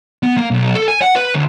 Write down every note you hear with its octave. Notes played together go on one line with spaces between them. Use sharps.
B3
A#3
B1
A4
G#5
F#5
B4
D2